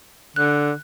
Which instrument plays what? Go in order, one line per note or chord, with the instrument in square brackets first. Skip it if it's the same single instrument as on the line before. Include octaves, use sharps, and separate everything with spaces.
[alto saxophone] D3 [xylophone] F#6